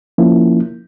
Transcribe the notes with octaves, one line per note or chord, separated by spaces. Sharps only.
F3 A#3 C#4 E4